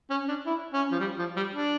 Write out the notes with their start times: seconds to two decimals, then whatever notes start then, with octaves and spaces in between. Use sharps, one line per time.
0.10 C#4
0.28 D4
0.46 E4
0.73 C#4
0.92 F3
1.00 G3
1.19 F3
1.36 G3
1.54 D4